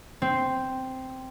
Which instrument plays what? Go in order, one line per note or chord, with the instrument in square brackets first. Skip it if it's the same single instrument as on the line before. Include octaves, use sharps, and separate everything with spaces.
[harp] C4